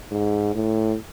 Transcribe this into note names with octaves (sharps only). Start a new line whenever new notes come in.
G#2
A2